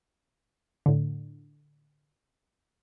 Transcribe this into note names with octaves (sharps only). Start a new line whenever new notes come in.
A2 D3